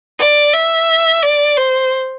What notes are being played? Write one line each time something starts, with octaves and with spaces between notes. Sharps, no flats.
D5
E5
D5
C5